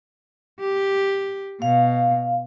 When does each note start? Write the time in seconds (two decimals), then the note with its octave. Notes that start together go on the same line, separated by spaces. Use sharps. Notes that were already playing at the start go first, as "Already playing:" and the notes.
0.60 G4
1.62 B2 F5